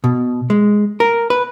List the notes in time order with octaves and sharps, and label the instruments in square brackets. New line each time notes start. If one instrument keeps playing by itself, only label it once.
[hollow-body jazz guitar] B2
G#3
A#4
B4